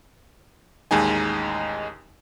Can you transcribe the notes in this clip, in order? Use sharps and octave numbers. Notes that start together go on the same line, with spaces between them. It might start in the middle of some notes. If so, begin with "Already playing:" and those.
A1 D#2 G#3 D#4 G#5